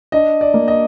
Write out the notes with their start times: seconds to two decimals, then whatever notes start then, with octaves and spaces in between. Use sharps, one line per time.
0.12 D4 D#5
0.41 D5
0.54 A#3
0.68 D#5